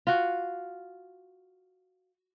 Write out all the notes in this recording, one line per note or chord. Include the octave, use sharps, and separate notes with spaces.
F4 F#4